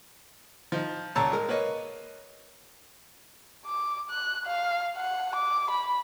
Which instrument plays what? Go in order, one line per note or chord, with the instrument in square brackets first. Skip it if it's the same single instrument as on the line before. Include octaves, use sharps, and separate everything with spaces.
[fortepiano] F3 D#4
C#2 A#2 C#5 A5 A#5 E6
G#3 A#4
A#3 B4 C#5 D#5
[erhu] D6
F#6
F5
F#5
D6
B5